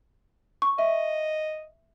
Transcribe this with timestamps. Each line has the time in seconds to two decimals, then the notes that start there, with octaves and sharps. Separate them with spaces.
0.62 C#6
0.79 D#5 E5